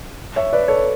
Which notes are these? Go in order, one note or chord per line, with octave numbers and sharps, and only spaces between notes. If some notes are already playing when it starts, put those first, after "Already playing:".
C#5 E5
B4 D5
A4 C#5